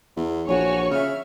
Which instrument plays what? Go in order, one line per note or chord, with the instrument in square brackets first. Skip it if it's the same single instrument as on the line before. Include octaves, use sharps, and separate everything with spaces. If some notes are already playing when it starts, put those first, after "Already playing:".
[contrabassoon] E2
[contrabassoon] A#1 [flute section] F#4 G#5 [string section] C#5 C#6
[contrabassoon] C#3 [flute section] E5 F6